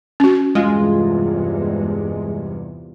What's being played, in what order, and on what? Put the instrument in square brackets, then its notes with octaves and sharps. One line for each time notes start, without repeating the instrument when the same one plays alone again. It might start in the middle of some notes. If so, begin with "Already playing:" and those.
[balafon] C#4 F#4
[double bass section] E2 G2 C3 [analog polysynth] G#3 [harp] F4